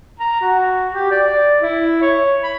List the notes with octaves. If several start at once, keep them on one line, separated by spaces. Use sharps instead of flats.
A#5
F#4
G4
D5
D5
E4
C#5
B5